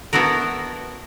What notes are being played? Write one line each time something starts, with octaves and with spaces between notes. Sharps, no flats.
B3 D4 E4 F#4 A#4